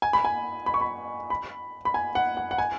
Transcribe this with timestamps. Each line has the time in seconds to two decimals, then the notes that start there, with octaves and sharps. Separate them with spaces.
0.02 G#5
0.13 B5
0.25 G#5
0.66 B5
0.74 C#6
0.81 B5
1.30 B5
1.85 B5
1.94 G#5
2.15 F#5
2.37 F#5
2.51 F#5
2.58 G#5